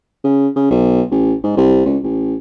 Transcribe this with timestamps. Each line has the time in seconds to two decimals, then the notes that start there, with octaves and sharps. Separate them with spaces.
0.24 C#3
0.56 C#3
0.71 B1
1.11 A1
1.43 G#2
1.57 C2
1.85 C#2
2.04 A1